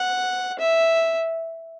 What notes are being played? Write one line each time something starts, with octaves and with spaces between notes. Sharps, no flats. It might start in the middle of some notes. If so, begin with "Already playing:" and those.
Already playing: F#5
E5